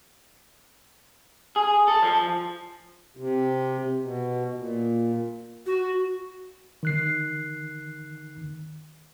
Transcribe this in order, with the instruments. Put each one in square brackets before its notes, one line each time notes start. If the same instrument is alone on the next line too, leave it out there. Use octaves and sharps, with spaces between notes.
[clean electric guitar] G#4
A4
F3
[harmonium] C3
B2
A#2
[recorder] F#4
[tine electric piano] D#3 F#6 C7